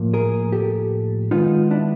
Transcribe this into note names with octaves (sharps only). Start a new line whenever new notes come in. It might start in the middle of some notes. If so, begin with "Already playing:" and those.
Already playing: A2 F3 A#3
G#4 A#4
G4 A4
D#3 G#3 B3 D#4 F4
D4 E4